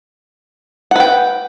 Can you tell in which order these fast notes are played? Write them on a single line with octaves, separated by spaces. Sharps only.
F#5 B4 G5